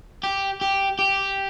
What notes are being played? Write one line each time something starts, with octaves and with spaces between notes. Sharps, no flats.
G4
G4
G4